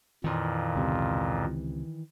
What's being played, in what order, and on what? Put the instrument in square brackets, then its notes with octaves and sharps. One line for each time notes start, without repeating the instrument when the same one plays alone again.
[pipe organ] F2 A#2 [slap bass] D#3 E3
[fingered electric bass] C#2 C3